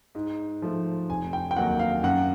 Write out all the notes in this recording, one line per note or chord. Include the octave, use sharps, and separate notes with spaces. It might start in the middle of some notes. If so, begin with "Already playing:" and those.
G#2
F3 A3
F1 G#5
G5
G5
D#2 D#3 F#3 A#3 F#5
F5
F#2 F#5